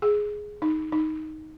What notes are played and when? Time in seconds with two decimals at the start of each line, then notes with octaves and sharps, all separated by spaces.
0.02 G#4
0.62 D#4
0.92 D#4